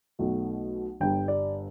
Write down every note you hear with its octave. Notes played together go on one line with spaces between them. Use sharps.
B1 B2 A3
G1 G2 G3 G5
D5